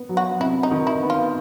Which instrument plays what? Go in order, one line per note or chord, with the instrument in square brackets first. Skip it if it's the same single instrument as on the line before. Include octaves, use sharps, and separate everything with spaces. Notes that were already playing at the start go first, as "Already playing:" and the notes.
Already playing: [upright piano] B3
F#3
[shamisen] F#4
[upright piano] C3 [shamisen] E4
[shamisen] D#4
[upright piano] D#3
[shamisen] E4
[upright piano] B3
[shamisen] F4